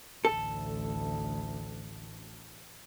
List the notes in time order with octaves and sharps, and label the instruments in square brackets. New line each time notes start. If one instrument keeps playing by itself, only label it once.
[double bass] A1 D2 [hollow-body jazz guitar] A4